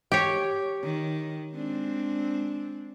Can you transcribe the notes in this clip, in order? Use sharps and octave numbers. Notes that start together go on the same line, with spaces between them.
G4 C#5
D#3
G#3 C4 D4